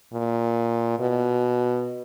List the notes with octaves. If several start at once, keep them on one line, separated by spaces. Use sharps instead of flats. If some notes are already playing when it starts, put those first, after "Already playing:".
A#2
B2